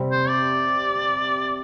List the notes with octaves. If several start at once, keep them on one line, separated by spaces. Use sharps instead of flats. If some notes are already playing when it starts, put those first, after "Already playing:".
Already playing: C3 G3 C4 G4
C5
D5